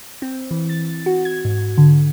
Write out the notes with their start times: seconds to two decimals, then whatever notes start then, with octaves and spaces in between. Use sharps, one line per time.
0.22 C4
0.51 E3
0.69 A6
1.06 F#4
1.25 G#6
1.45 G#2
1.78 D3